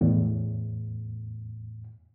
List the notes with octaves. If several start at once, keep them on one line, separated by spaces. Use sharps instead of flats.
E2 A2